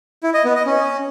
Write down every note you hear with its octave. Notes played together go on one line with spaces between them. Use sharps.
E4
D#5
B3
D#5
C#4